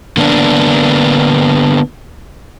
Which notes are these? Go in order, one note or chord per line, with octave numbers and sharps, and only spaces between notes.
D3 A#3 B3 D4